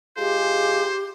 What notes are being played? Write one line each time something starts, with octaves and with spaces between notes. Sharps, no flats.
G#3 F4 G4 G#4 C5